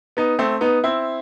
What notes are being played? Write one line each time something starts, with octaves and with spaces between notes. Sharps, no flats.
B3 D#4
A3 C4
B3 D#4
C4 E4